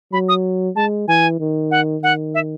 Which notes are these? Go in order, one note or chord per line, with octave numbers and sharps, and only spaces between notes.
F#3 B5
D#6
G#3 A5
E3 G#5
D#3
F#5
D#3 F#5
E5